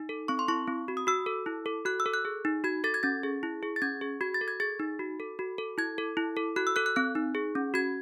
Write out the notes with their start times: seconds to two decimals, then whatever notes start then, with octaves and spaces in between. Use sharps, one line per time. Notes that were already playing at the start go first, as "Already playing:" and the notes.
Already playing: D#4
0.09 A4
0.28 C4 C#6
0.39 C6
0.48 E4 C#6
0.67 C4
0.88 F#4
0.97 D#6
1.07 F#4 E6
1.26 A4
1.46 E4
1.66 A4
1.85 F#4 F#6
2.00 E6
2.06 A4
2.14 F#6
2.25 G#4
2.45 D#4
2.64 F#4 G#6
2.84 A4 A6
2.94 G#6
3.03 C#4 A6
3.23 G#4
3.43 E4
3.63 G#4
3.76 A6
3.82 C#4 G#6
4.01 G#4
4.21 F#4 G#6
4.34 A6
4.41 A4
4.48 G#6
4.60 G#4 A6
4.80 D#4
4.99 F#4
5.20 A4
5.39 F#4
5.58 A4
5.78 E4 G#6
5.98 A4
6.17 E4
6.37 A4
6.56 F#4 F#6
6.67 E6
6.76 A4 F#6
6.86 F#6
6.96 C4 F#6
7.15 D#4
7.35 G#4
7.55 C#4
7.74 F#4 G#6